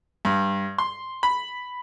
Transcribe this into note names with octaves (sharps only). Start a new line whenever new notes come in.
G2
C6
B5